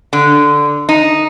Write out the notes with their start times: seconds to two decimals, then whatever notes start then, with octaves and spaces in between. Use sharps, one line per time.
0.13 D3
0.89 D#4